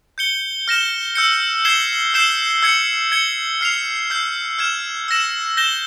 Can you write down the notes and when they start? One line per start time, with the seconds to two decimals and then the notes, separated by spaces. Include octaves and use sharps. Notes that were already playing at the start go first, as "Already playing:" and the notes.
0.18 G6 C#7 G7
0.68 F6 A#6 E7 G7
1.15 E6 G6 C#7
1.65 G#6 C7 E7 G7
2.14 E6 G6 C7 E7 G7
2.62 E6 G#6 C#7
3.12 G#6 C#7 G7
3.61 F6 C7 F7
4.10 E6 G6 C7
4.59 F6 G#6 E7
5.08 E6 A#6 E7
5.57 G6 A#6 E7 G7